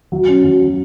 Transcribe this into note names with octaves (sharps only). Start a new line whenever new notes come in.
F#3
C#4
F#3
F#3